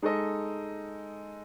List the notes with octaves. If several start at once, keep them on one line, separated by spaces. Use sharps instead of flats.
G#3 D#4 A4 D#5